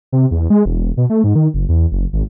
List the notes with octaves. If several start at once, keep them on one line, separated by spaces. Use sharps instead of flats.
C3
E2
G#3
E1
B2
A3
G#2
D#3
F#1
E2
F#1
G#1